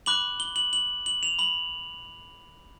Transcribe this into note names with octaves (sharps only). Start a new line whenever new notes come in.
B5 D6 F#6 F#7
G7
F#7
F#7
F#7
F7
B5 F#7